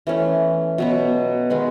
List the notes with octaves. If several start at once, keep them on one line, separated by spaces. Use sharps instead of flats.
E3 A3 C#4
B2 F#3 B3
D#3 G#3 B3